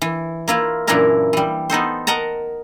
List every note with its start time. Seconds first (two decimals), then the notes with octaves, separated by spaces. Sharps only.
0.02 E3
0.48 A#3 E4 F4
0.87 F#2 A#2 E3 D4 E4 A#4
1.33 E3 G3
1.70 B3 D#4 A4 C5
2.07 A#4 D#5 F#5 A5 A#5